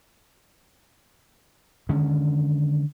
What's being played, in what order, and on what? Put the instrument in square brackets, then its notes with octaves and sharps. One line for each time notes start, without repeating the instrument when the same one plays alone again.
[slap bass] D3 D#3 G#3 C#4